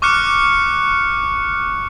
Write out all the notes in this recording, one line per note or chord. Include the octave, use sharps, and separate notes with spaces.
C#6 D6 F6 F#6 C#7